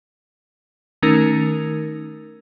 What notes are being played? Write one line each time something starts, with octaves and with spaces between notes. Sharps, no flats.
D#3 A3 C#4 D#4 A#4